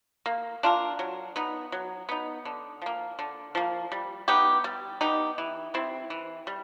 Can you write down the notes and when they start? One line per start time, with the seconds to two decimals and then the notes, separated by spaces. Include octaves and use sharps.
0.26 A#3
0.63 D4 F4 A#4
0.99 F#3
1.36 B3 D#4
1.72 F#3
2.09 B3 D#4
2.45 D3
2.82 F3 A#3
3.19 D3
3.55 F3 A#3
3.92 G3
4.28 B3 D#4 G4
4.64 G3
5.01 B3 D#4 G4
5.38 E3
5.74 G3 C4 E4
6.10 E3
6.47 G3